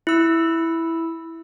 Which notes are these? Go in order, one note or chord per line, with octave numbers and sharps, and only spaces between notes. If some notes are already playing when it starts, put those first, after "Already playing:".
E4 E6